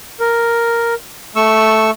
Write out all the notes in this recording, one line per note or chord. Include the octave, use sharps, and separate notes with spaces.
A#4
A3 C#6 E6